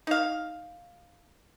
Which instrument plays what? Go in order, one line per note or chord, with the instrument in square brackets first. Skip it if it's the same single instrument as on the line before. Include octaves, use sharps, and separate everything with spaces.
[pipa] D#4 F5